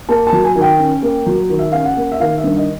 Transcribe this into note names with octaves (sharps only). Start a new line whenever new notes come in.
A#3 A5
A5
F#3
G#5
D#3
G5
C#4
A#3
F#3
D#3
E5
C#4 F5
F#5
A#3
E5
D#3 F5
E5
G2
D#5